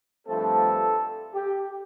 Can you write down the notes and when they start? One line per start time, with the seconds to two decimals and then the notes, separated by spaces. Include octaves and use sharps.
0.26 G2 F3 A3 C4 A4
1.34 G4